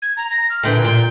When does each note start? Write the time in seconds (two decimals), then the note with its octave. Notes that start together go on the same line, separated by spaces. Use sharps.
0.02 G#6
0.17 A#5
0.31 A#6
0.50 F6
0.63 A#2 D3 E3 G5
0.85 A#2